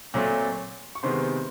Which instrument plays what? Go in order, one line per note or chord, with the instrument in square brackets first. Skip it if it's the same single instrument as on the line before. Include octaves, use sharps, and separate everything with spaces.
[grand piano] A#2 F#3 A3 C4
C#6
C3 D#3 G#3 B3 C5 C6